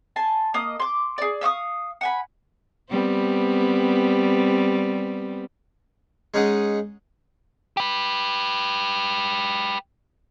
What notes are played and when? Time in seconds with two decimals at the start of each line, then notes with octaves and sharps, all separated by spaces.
0.16 G#5 A5 C6
0.54 A#3 D#5 D#6
0.80 C6 D6
1.18 G#4 D5
1.41 E5 F5 C#6 D#6
2.01 F#5 G#5 B5
2.90 G3 B3 C4
6.34 G#3 C#4 D#4 G#4 D#5 F#5
7.77 G4 B4